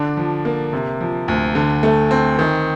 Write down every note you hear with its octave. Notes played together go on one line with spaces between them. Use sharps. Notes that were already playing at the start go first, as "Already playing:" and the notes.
Already playing: D3 D4
F3
A#3
C3
F3
D2
D3
A3
C4
D#3